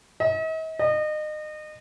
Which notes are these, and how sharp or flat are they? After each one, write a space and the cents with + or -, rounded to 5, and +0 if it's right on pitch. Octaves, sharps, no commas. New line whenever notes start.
D#5 +45
D#5 -30